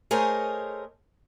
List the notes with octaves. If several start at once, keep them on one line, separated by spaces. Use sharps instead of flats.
A3 G#4 A#4 C5 C#5 D#5